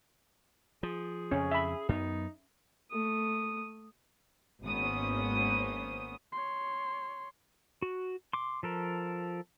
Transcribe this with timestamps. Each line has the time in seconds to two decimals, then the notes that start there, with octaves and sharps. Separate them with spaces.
0.83 F3 G#4
1.31 F2 C#3 C#4
1.51 E5 B5
1.89 F#2 B3 D#4
2.92 A3 D#6
4.64 G#1 A#3 B3 C#4 C5 D#6
6.32 C#5 C6
7.82 F#4
8.33 C6 D6
8.63 F3 A4 A#4